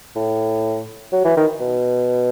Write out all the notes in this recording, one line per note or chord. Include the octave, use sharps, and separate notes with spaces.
A2
F#3
E3
D#3
B2